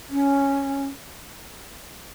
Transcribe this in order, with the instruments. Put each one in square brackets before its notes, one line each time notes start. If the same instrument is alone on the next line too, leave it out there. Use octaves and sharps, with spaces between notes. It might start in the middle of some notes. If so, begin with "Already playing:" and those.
[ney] C#4